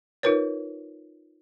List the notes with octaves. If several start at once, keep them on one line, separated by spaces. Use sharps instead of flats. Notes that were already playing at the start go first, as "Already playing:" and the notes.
D#4 F4 A#4 B4 C#5